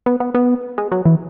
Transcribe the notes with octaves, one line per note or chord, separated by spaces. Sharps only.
B3
B3
B3
G#3
F#3
E3